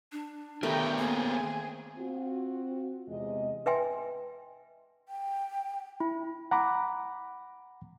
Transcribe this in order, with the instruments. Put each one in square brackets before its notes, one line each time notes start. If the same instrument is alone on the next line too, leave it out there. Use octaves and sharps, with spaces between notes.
[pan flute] D4
[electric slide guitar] D#3 B3 A#4 [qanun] A3 [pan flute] G4 [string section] B4 G5 A#5
[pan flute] A#3 [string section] C4 G#4
[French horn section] C4 F4 F#4
E2 C3 G#3 D#5
[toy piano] B4 D#5 E5 G5 G#5 C6
[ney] G5
[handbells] E4
[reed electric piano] F#5 A#5 B5 D6